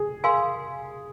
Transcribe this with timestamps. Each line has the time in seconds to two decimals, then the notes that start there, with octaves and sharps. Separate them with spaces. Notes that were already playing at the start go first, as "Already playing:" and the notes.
Already playing: G#4
0.24 A#4 F5 G#5 C6